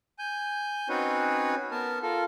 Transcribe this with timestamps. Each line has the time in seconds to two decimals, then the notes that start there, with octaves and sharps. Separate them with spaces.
0.19 G#5 G6
0.89 C4 C#4 D#4 F#4 B4 C#5
1.71 B3 A#4 A5
2.02 F4 A4 A#4